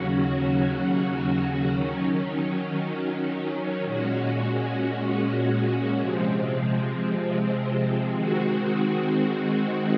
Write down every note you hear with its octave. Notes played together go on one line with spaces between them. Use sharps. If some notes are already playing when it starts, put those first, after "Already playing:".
Already playing: D#2 C#3 F#3 C#4 F#4
D#3 F#3 C#4
A#2 G#3 C#4 F#4
C3 F3 G#3 C4
D#3 G#3 C4 F#4